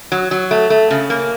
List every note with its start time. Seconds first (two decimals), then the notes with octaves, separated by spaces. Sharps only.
0.12 F#3
0.31 F#3
0.51 A3
0.70 A3
0.90 C#3
1.10 A#3